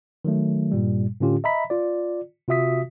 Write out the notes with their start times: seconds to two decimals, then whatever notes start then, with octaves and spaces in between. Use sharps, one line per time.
0.25 D#3 F#3 A3
0.72 G2 A#2 G3
1.20 A2 D3 C#4 F4 G4
1.44 D#5 E5 A#5 B5 B6
1.70 F4 D5
2.48 C3 F4 F#4 E5 D#6 B6